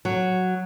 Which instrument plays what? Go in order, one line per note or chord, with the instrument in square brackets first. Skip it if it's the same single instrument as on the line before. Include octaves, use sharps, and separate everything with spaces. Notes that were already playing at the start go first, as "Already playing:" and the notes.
[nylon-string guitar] F#3